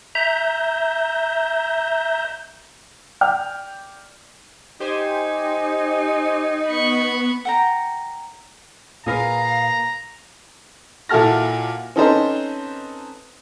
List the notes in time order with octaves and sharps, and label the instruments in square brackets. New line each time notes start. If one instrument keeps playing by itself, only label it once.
[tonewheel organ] E5 A#5 G6
[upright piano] D5 G5 F6 G6
[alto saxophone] D#4 [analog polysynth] G4 C5 G#5
[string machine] B3 [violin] B5 C#6
[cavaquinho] F#5 G5 A#5
[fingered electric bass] A#2 [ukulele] G#4 A#4 B4 [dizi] F5 [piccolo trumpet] A#5
[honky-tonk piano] A#2 E4 F#4 A4 F6 A#6
C4 C#4 D#4 A4 B4 C5